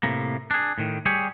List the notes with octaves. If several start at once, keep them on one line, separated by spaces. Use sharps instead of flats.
A2 C3 A#3
D4 G#4
A2 D#3
G3 G4 G#4 C#5